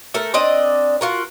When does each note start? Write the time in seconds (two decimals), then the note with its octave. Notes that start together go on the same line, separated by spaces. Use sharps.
0.14 A3 A4 A#4
0.34 C4 D4 D5 D#5
1.01 F4 F#4 A#4